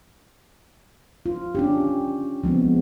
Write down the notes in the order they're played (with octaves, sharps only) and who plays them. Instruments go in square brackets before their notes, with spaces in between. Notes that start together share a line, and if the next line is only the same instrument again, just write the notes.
[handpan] F4
C#4 D4 G4
F3 G#3 B3 C4